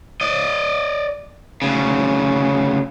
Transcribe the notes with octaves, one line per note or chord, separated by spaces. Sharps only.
D5 D#5
D2 C#3